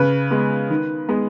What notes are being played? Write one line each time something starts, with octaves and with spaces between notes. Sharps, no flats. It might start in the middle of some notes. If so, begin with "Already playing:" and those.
Already playing: C#3 B4
G#3 B3
D#3
G#3 B3